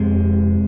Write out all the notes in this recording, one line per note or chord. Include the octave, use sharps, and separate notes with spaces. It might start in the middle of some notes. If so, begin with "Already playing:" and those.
Already playing: F2 C3 G#3